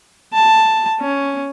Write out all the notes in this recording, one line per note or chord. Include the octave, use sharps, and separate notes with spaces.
A5
C#4